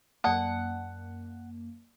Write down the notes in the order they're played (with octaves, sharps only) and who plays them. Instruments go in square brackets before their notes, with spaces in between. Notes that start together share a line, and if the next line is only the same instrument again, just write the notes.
[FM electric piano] F#2 A#3 [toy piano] D5 A5 D#6 [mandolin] F#5